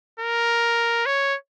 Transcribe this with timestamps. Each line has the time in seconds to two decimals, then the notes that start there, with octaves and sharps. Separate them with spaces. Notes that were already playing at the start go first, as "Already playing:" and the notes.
0.20 A#4
1.06 C#5